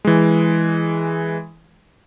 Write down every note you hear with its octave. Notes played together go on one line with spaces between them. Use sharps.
E3 G#3